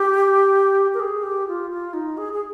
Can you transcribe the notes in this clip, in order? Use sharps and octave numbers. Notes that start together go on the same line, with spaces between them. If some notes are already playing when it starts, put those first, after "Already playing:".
Already playing: G4
A#4
G#4
G4
F4
F4
D#4
G#4
G#4